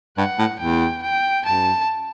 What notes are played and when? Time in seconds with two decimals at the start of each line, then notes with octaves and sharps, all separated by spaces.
0.17 G2 F#5
0.39 A2
0.60 E2 G5
1.03 G5
1.45 F#2 A5